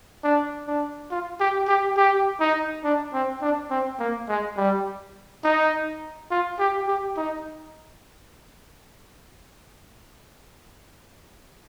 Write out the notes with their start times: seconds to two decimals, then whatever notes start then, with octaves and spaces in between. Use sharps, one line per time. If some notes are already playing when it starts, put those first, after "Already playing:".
0.24 D4
0.68 D4
1.11 F4
1.40 G4
1.68 G4
1.97 G4
2.40 D#4
2.84 D4
3.13 C4
3.42 D4
3.71 C4
4.00 A#3
4.28 G#3
4.57 G3
5.44 D#4
6.31 F4
6.59 G4
6.87 G4
7.17 D#4